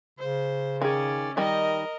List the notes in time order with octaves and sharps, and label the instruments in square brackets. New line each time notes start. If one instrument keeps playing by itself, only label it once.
[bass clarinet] C#3 [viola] C5
[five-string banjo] D#3 G#4 [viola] C#4 D5
[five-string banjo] D#3 G3 [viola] A#4 D#5